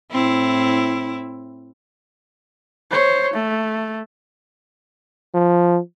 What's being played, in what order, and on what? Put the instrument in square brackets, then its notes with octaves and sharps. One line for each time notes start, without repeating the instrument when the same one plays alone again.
[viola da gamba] A2 C4 E4
[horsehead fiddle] C5 C#5
A3
[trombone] F3